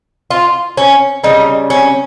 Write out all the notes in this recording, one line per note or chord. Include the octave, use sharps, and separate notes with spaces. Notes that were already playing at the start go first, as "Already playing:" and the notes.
F4
C#4
C#3 G3 D#4
C#4